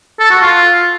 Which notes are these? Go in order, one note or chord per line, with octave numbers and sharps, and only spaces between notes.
A4
F#4
F4